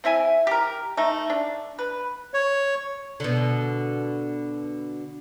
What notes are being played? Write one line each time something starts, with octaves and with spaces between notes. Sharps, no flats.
C4 E4 E5 G#5
G4 A#4
A3 D#4
D4
B4
C#5
B2 D3